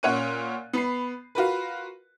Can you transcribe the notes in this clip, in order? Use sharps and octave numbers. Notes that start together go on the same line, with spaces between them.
A#2 C#4 C#5 F#5 F#6 D#7
B3 B5 C7
F4 F#4 A#4 B4